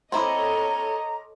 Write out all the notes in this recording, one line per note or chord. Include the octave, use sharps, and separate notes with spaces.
C4 E4 A4 C#5 D#5 A#5 C6 D6